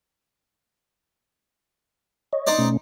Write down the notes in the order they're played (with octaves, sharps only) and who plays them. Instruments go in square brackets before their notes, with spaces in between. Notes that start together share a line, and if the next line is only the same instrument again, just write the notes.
[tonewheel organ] C#5 D#5
[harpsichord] D#4 C5 D5
[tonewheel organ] B2 A3 C#4